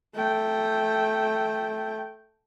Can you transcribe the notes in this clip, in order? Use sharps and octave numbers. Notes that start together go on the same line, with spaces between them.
A3 G5